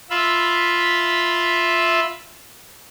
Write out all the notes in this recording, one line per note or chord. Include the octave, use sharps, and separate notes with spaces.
F4 E5 B5